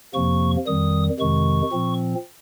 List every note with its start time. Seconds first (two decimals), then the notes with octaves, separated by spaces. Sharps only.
0.14 F2 C3 F3 A#3 C#6
0.67 F2 D#3 G3 D#6
1.19 F2 C3 D#3 G#3 C#6
1.72 A#2 F3 C4